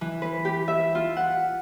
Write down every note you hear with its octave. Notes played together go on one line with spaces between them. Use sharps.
E3
B4
G4
E5
F4
F#5